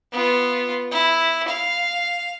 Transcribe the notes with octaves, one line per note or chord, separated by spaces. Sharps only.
B3 F4
E4
F5